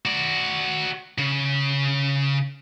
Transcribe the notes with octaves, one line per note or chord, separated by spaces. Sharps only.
F#4 D5
C#3